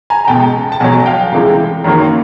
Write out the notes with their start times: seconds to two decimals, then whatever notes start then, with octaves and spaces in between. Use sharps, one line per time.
0.10 G#5 A#5
0.25 A#5
0.28 C#2 B2 G#3 G5 A5
0.72 A5
0.80 B1 B2 F#3 F#5 G#5
1.06 F5 G5
1.32 C2 C3 E3 G#3
1.84 F#2 D#3 F#3 A#3